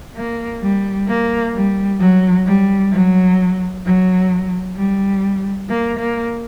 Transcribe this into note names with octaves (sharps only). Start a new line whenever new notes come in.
A#3
G3
A#3
G3
F#3
G3
F#3
F#3
G3
A#3
A#3